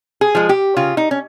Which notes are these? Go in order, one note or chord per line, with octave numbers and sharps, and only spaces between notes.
G#4
F3 G#3
G4
C#3 F4
D#4
C#4